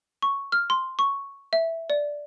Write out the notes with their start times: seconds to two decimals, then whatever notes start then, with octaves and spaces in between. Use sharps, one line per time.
0.22 C#6
0.52 F6
0.70 C6
0.99 C#6
1.53 E5
1.90 D5